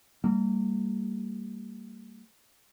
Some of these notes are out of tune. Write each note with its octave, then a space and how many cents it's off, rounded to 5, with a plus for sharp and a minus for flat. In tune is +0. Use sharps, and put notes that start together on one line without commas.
G3 +0 A#3 -30